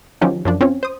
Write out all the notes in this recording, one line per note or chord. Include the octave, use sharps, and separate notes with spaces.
D#3 F3 F#3 C#4 D#4 G4
F#2 F3 D4
C4 C#4 F4 C#5
C5 D#6